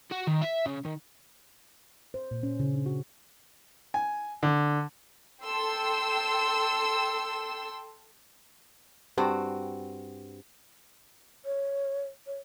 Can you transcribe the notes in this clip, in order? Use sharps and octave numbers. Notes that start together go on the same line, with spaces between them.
F#4
D#3
E5
C#3
D#3
C5
A#2
C#4
C#3
D4
F#4
G#5
D3
A4 G5 C6 E6
G2 C4 F#4
C#5
C#5